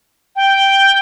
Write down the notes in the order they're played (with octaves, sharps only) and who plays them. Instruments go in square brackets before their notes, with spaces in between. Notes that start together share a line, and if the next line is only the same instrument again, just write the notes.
[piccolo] G5